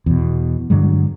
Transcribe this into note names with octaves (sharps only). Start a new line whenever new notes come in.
E2 B2
G2 D3 F#3 G#3